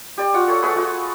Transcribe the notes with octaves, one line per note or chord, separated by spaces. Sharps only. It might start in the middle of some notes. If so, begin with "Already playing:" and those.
G4 D5
F4 F#4 F#5
A4 C#5
A3 F#4 G#4 B4
F4 F#4 E5